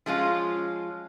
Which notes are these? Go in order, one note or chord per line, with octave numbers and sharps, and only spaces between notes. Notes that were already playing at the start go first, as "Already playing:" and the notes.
F3 G#3 C#4 F4